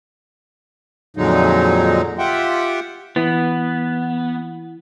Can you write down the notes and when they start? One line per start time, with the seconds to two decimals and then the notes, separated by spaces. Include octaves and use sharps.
1.17 F2 A#2 D3 F#3 G#3 D#4
2.18 F4 G4 E5 F#5 G5
3.16 E3 B3